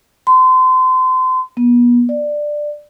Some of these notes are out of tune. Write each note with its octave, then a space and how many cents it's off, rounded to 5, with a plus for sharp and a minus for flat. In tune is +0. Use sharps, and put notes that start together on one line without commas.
C6 -30
B3 -35
D5 +10